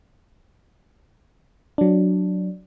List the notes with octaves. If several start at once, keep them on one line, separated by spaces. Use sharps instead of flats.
F#3 D4